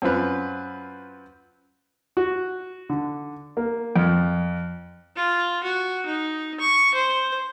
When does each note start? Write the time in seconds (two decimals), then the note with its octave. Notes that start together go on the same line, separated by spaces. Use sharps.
0.02 F#2 C4 F4 B4
2.17 F#4
2.90 D3
3.57 A#3
3.96 F2
5.16 F4
5.63 F#4
6.06 D#4
6.60 C#6
6.94 C5